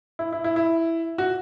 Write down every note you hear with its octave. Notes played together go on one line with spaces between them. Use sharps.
E4
E4
E4
E4
F#4